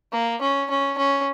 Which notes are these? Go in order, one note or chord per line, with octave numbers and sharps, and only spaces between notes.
A#3
C#4
C#4
C#4